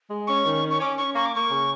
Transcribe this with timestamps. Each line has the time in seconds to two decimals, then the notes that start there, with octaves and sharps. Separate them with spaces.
0.10 G#3
0.27 C#4 C#6
0.45 D#3
0.63 C#4
0.70 C#6
0.80 C#4 D6
0.97 C#4 C#6
1.15 A#3 C#6
1.25 D6
1.33 A#3 C#6
1.51 C#3